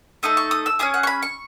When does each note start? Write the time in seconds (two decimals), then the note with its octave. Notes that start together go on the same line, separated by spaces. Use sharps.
0.23 A3 D#4 A4 D#6
0.37 C#6
0.51 D#6
0.66 E6
0.79 C#4 E4 G#4 D#6
0.94 F#5
1.03 C#6
1.07 B5
1.22 C#6